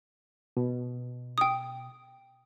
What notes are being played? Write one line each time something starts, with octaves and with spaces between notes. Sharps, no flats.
B2
G5 D#6